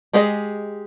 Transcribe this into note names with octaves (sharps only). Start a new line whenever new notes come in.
G#3 G4 G#4 D#5